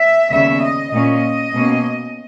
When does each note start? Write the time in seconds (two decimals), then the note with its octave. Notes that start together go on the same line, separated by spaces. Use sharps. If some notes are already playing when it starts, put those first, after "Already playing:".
Already playing: E5
0.30 D#2 C#3 G3 B3 E5
0.60 D#5
0.92 A#2 A#3 C#4 D#5
1.54 B2 A#3 C#4